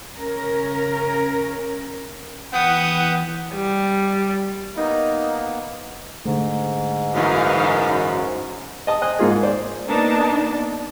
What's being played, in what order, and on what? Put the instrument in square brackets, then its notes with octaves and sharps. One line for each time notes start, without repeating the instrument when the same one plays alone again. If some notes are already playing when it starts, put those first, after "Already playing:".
[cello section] C#3 C#4 A#4
[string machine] E3 [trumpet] B3 [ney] F#5 [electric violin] G5 D#6
[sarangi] G3
[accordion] A#3 B3 [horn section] D#4
[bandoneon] G#2 [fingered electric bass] D3 A3
[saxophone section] F#2 [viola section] E3 D#4 F5
[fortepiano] D#5 A5 D#6
C5 D#5 G#5 F#6
G#2 A#3 F4 G#4
C5 D5
[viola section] A#3 B3 D4 D#4 A5